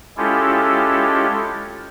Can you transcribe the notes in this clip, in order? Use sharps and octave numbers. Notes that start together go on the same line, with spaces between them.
G#3 C#4 E4 F4 G4 A4